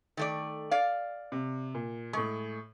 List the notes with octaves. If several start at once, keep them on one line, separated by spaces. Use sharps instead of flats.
D#3 A3 D5
D5 F5
C3
A#2
A2 G#3 C#6